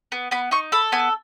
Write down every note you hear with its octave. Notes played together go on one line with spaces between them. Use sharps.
B3
B3 B5
D#4 C#6
A4 B5
B3 G#5